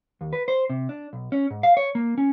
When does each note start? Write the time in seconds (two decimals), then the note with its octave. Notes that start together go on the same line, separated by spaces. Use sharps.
0.21 D#2
0.33 B4
0.48 C5
0.70 C3
0.89 D4
1.13 B1
1.32 C#4
1.51 G#2
1.63 F5
1.77 C#5
1.95 A#3
2.18 C#4